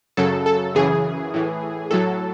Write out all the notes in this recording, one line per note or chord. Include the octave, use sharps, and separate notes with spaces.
F#2 C#3 F#3 A4
A4
F#2 C#3 E3 G#4
A2 E3
A2 F#3 A4